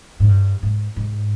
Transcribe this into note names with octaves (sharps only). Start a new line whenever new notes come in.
G#2
G2
G#2
G#2